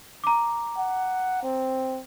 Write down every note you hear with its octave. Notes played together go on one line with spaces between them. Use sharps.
A#5 D6
F#5
C4